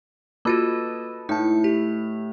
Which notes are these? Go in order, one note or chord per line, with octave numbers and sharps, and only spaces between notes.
A#3 F4 F#4 A4 B4 D#5
A2 D#4 A5
G4